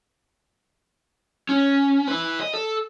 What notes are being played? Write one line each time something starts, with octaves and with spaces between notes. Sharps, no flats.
C#4
E4 B4
D#5
A4